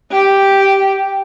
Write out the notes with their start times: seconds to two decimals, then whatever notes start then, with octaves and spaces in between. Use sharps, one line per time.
0.11 G4